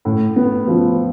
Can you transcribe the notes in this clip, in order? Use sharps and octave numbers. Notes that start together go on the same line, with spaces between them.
A2
B3
F3